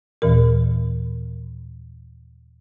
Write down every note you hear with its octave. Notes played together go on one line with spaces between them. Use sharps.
D#2 A#2 E3 A#4